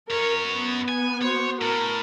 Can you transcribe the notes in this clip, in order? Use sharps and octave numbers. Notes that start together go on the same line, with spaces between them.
F#2 A#4 C#5
B3
G#5
F#4 C5 C#5
A2 A#4